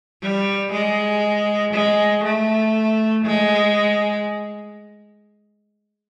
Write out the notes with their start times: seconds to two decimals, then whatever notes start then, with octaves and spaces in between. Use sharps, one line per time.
0.23 G3
0.73 G#3
1.74 G#3
2.24 A3
3.25 G#3